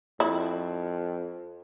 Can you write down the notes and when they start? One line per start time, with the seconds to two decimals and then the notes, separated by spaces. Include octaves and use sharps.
0.20 F2 E4